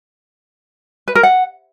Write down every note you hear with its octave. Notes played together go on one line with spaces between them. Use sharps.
B4
A#4
F#5